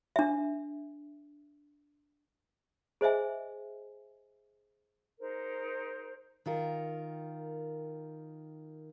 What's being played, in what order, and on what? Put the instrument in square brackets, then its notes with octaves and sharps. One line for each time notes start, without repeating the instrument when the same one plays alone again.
[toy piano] D4 E5
G#4 C5 D#5 E5 G#5
[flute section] D#4 G#4 A#4 C5
[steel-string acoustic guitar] D#3 F4 A#4